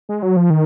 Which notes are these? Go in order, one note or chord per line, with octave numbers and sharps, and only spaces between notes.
G#3
F#3
F3
D#3